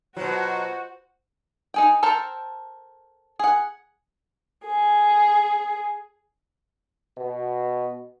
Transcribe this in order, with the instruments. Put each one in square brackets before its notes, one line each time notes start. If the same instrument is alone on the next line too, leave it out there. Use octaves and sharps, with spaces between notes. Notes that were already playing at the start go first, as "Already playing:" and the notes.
[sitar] B2 F#3 [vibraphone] F4 B4 [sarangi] F#4 [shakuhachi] C5
[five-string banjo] D#4 G#4 G5
A4 A#4 C5 G5 A5
G#4 F#5
[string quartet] G#4
[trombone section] B2